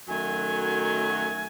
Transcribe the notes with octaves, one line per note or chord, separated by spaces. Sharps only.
F#2 D#3 F#3 A3 G#5